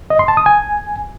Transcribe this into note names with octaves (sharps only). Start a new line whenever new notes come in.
D#5
C6
A5
D#6
G#5